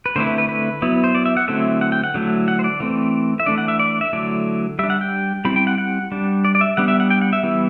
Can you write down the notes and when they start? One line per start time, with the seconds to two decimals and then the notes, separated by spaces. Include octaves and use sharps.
0.06 B4
0.16 D3 A3 C4 E4 C5
0.27 B4
0.38 B4
0.49 B4
0.82 F#3 B3 E4
1.04 C5
1.15 D5
1.25 E5
1.37 F#5
1.48 D3 F#3 A3 C4 E4 E5
1.81 F#5
1.92 G5
2.04 F#5
2.14 D3 F#3 A3 E4
2.48 F#5
2.59 C5
2.64 D5
2.80 E3 A3 C4
3.40 E5
3.46 E3 A3 D4 D5
3.58 F#5
3.68 E5
3.79 D5
4.01 E5
4.13 D3 F#3 A3 E4 D5
4.79 G3 E5
4.83 D4
4.90 F#5
5.01 G5
5.45 G3 C4 E4 B5
5.56 G5
5.67 F#5
5.78 F#5
6.12 G3 D4
6.45 D5
6.55 D5
6.61 E5
6.77 G3 B3 D4 F#5
6.88 E5
7.00 F#5
7.10 G5
7.22 F#5
7.33 E5
7.43 E3 G3 B3 E4